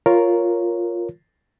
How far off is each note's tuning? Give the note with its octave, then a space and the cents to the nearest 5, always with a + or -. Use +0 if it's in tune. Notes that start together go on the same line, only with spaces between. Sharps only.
F4 +0 A#4 +0 C#5 +0